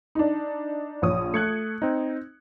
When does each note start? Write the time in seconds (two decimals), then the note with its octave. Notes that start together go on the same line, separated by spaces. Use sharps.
0.15 D4 D#4
1.02 A#1 C#5 D#6
1.34 A3 F#6 G#6 C#7
1.82 C4 D#4